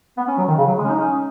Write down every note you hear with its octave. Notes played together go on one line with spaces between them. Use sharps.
B3
C#4
F#3
D#3
C#3
F#3
G#3
C#4
D#4
C#4